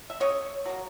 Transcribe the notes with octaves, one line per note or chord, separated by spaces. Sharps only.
E5
C#3 C#5 D#5
F#3 A#3